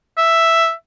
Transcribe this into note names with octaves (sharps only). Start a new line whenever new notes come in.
E5